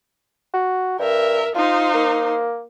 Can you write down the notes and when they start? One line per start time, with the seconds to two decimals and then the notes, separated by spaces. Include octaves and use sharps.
0.54 F#4
0.99 G2 A#4 E5
1.55 D#4 F4 C5
1.94 A#3